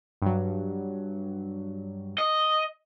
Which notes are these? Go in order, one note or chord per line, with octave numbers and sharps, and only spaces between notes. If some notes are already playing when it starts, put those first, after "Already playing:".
G2 F#3
D#5